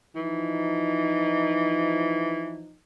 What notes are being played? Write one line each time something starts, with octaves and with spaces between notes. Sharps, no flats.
E3 F3 D#4